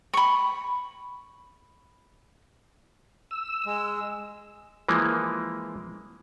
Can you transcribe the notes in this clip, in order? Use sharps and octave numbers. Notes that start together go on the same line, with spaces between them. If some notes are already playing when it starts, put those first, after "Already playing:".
B5 C#6
E6
G#3
E3 F3 G#3 A#3